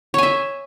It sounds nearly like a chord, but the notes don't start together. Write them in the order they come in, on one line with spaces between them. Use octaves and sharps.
C#5 G#5 E5